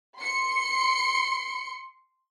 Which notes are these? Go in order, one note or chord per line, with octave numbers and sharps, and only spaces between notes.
C6 C#7